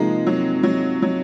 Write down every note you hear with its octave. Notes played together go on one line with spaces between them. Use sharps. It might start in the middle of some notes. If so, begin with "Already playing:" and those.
Already playing: C3 F3 G#3 A#3 D#4
F#3
F#3
F#3